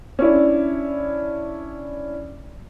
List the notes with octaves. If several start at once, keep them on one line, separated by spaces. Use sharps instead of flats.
C#4 D4 E4